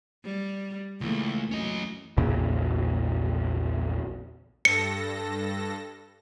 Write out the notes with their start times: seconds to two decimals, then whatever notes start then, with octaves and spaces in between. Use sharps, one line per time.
0.24 G3
1.01 C#2 E3 A3 A#3
1.51 F#2 C#4 D#5
2.17 A#1 E2 A#2 C#3
4.65 G2 A4 A#6 C#7